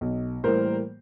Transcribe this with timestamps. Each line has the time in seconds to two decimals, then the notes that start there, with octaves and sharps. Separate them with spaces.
0.01 B1
0.43 A2 E3 G3 A#3 A#4 C5